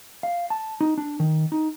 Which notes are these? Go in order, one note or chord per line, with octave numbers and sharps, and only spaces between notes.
F5
A5
D#4
D4
D#3
D#4